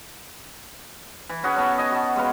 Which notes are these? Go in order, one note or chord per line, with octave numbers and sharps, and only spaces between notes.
E3
C#4 F#4 G#4 B4
B3 A4 C#5
D#5 G#5
F#4 A5
G#3 B3 F5 B5